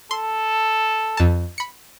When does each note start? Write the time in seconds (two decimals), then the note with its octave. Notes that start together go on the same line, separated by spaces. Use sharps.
0.11 A4 C6
1.17 F2 A5
1.58 B5 C#7